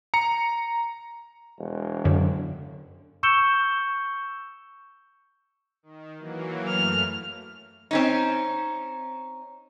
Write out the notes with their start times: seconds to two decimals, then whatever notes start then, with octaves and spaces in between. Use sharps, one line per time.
0.14 A#5 C#7
1.59 E1
2.05 F#2 D3
3.23 C#6 E6 G6 C#7 E7 G7
5.83 D#3
6.19 E3 F#3 A#3
6.68 F#2 A3 F6
7.91 C4 C#4 D#4